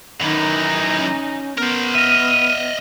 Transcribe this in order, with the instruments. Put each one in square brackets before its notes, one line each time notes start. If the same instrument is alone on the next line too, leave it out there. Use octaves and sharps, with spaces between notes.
[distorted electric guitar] F#2 E3 [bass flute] D#3 [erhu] D#4
[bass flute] C#4
[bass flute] B3 [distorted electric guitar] A#4 C5
[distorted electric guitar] D#5 E5 [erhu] F6 [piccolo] D#7